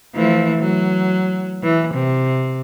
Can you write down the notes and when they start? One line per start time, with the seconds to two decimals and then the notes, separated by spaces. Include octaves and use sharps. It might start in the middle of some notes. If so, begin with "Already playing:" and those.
0.15 E3 F3 A3
0.59 F#3
1.63 E3
1.94 C3